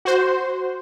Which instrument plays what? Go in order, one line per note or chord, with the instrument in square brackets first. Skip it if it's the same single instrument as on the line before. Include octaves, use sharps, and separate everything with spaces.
[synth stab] F#4 C5